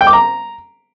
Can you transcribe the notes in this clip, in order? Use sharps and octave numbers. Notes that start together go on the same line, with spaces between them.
G5
D6
A#5